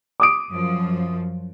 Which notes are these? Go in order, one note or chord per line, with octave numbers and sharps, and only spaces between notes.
D6 D#6 D7
F#2 F3